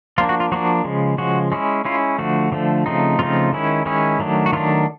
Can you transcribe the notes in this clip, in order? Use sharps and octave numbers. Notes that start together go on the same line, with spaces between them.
F3 A#3 D4 F4
F#4
F4
F3 A#3 D4 F#4
C#3 F3 G#3
C#3 F3 G#3 F#4
G#3 C#4 E4
G#3 C#4 E4 F4
D3 F3 A3 F#4
D3 F3 A3
C#3 F3 A3 C4 D#4
C#3 F3 A3 C4 D#4 F4
D#3 G#3 C#4 E4
D#3 G#3 C#4 E4
D#3 F#3 A3 D4
F#4
D#3 F#3 A3 D4 F4